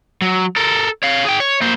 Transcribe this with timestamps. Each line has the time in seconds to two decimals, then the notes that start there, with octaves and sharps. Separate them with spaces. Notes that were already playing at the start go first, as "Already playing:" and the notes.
0.22 F#3
0.56 A4 A#4
1.03 C#5 F5
1.25 G#4 G5
1.40 C#5
1.62 A#3 C5